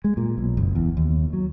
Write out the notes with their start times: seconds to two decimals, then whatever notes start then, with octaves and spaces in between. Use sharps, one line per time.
0.04 G#3
0.17 A#2
0.38 B1
0.57 F#1
0.75 E2
0.97 D#2
1.33 F#3